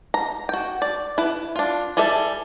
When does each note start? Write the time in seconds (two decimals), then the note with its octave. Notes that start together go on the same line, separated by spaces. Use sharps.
0.14 A#5
0.49 F#4 G5
0.82 D5
1.18 E4 B4
1.56 D4 F4
1.97 G3 G#4 A4 D5 E5